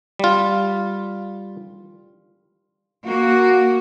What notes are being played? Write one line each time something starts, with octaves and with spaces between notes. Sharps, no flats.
G3 F4
A#3 F#4